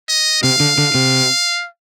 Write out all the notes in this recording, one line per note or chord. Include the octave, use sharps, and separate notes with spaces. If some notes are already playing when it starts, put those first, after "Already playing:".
D#5
C3 F5
D3
D3
C3